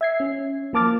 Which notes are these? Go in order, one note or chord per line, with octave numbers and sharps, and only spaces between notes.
E5 G#6 C7
C#4
F3 A#3 A5 D6 F6 A6